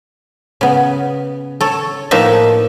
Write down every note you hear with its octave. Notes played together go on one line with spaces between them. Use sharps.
C#3 B3
A4 C#5
A2 F3 A#3 D#4 B4 E5